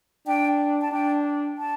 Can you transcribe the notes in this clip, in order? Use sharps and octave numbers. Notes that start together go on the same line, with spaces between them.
D4 G5
A5
D4 G5
A5